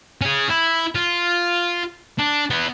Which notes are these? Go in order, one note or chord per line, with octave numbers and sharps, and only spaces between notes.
C#4 G#4
E4
F4
D4
B3 E4